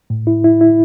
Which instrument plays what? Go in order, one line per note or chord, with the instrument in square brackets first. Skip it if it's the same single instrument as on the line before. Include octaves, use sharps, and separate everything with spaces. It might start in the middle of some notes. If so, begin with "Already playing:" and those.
[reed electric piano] A2
E4
E4
E4